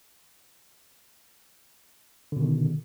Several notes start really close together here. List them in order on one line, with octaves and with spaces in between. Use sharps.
D3 B2 D#3